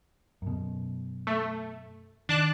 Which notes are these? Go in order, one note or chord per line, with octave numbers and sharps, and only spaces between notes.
F#2 B2
A3
D#3 D4 A5 F#6